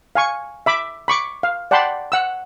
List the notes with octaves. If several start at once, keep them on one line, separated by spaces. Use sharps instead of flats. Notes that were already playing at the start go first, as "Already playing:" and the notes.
F5 G#5 C#6
E5 B5 D6
B5 C#6 D6
F5
D5 F#5 G5 A5 B5 C6
F#5 E6